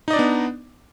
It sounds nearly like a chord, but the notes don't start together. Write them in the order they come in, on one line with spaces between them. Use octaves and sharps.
D#4 D#5 D5 D4 B3